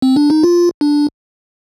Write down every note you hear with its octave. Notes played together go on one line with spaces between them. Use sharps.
C4
D4
D#4
F4
D4